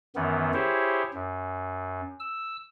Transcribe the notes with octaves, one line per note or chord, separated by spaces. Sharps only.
F#2 D#3 E3 B3
E4 G4 G#4 C5 C#5
F#2
E6